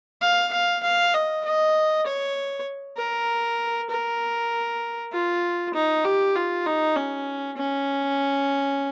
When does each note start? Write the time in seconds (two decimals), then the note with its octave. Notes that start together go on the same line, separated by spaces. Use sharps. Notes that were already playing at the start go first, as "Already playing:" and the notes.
0.21 F5
0.53 F5
0.83 F5
1.14 D#5
1.45 D#5
2.06 C#5
2.98 A#4
3.90 A#4
5.12 F4
5.74 D#4
6.04 G4
6.35 F4
6.66 D#4
6.96 C#4
7.57 C#4